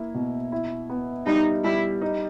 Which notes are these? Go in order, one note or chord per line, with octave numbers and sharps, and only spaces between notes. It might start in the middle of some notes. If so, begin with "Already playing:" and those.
Already playing: A#3 E4
B2
E4
B3
G3 D#4
G3 E4
D#4